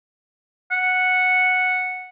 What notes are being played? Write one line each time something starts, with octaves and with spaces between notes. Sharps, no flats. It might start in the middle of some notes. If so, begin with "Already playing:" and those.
F#5